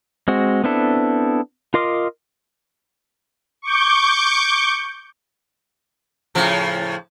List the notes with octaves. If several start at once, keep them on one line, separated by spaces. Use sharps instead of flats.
G#3 C4 F#4
B3 C4 D4 E4 A4
F4 A#4 D#5 C6 D6
C#6 D6 G6
A2 C#3 F3